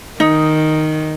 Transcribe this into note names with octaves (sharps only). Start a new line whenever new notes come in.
D#3 D#4